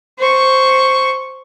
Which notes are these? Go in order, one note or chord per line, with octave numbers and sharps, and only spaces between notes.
C5 C#6